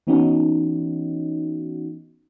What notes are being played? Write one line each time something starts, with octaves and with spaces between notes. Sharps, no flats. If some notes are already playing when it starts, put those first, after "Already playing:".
E3 B3 C#4 D#4 F#4